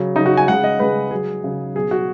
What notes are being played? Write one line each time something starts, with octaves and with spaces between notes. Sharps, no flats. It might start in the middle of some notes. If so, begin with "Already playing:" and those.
Already playing: C#3 F#3
C#3 F#3 D#4
F#4
G#5
C#3 G#3 F#5
D#5
C#3 G#3 B4
C#3 F#3 G#4
C#3 F#3
B2 F#3 G#4
F#4